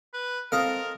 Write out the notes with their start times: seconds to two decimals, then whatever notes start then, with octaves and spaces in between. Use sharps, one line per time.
0.14 B4
0.52 C4 F4 A4 A#4 D#5 F5